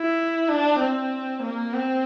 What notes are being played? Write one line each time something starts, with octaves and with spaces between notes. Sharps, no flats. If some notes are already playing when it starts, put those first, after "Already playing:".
Already playing: E4
D4
C4
A#3
C4